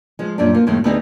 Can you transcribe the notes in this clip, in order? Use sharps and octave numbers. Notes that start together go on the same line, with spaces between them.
F3 G#3
F#2 A#2 G3 D4
F3 A#3 F4
F#2 A2 D#3 G#3 A#3
D2 B3 D#4 G4 G#4